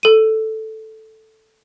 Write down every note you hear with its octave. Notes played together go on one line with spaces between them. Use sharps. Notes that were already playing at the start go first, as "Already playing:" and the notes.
A4 D#7